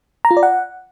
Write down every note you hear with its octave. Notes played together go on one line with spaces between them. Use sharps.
A#5
F4
D5
F#5